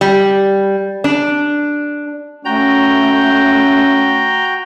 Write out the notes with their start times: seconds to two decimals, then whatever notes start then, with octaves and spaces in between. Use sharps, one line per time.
0.01 G3
1.04 D4
2.45 A3 C#4 F#4 G5 A#5 G6